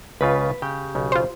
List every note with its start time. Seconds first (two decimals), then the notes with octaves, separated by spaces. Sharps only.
0.21 C#2 C#3 F4 B4
0.62 C#3 G4
0.95 B1 C#3
1.12 F4 C5